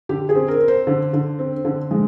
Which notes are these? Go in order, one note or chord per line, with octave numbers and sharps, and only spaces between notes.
D3 G4
G#4
C4
A#4
C4
C5
D3
D3
C4
D3
G#3